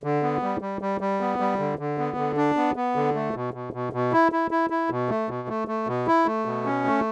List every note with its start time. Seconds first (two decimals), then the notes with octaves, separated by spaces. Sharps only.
0.04 D3
0.23 B3
0.43 G3
0.61 G3
0.82 G3
1.01 G3
1.21 B3
1.40 G3
1.59 D3
1.79 D3
1.98 B3
2.17 D3
2.37 D4
2.57 B3
2.76 B3
2.96 D3
3.15 A3
3.34 B2
3.54 B2
3.73 B2
3.93 B2
4.12 E4
4.32 E4
4.51 E4
4.70 E4
4.90 B2
5.09 A3
5.29 B2
5.48 A3
5.68 A3
5.87 B2
6.07 E4
6.26 A3
6.46 B2
6.66 C#4
6.85 A3